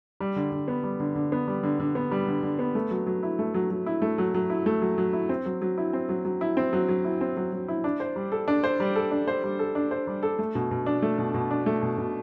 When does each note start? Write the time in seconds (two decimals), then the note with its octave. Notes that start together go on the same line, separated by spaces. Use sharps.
0.20 G3
0.36 D3
0.52 D3
0.68 B3
0.84 G3
1.00 D3
1.15 D3
1.32 B3
1.48 G3
1.63 D3
1.80 D3
1.95 B3
2.11 G3
2.28 D3
2.43 D3
2.59 B3
2.75 A3
2.90 F#3
3.07 F#3
3.23 E4
3.39 A3
3.54 F#3
3.70 F#3
3.86 E4
4.02 A3
4.18 F#3
4.35 F#3
4.50 E4
4.66 A3
4.82 F#3
4.98 F#3
5.13 E4
5.29 C4
5.46 F#3
5.62 F#3
5.78 E4
5.93 C4
6.09 F#3
6.25 F#3
6.41 E4
6.57 C4
6.73 F#3
6.88 F#3
7.05 E4
7.21 C4
7.37 F#3
7.52 F#3
7.68 E4
7.84 D4
8.00 C5
8.16 G3
8.32 A4
8.48 D4
8.64 C5
8.80 G3
8.96 A4
9.11 D4
9.28 C5
9.43 G3
9.59 A4
9.75 D4
9.91 C5
10.07 G3
10.23 A4
10.39 A3
10.55 B2
10.71 B2
10.86 D4
11.02 A3
11.18 B2
11.34 B2
11.51 D4
11.66 A3
11.82 B2
11.98 B2